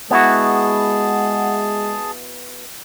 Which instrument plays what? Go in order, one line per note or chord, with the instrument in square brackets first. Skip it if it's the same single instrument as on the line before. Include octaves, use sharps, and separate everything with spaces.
[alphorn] G#3 [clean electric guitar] B3 E4 F#4 [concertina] G#4 A5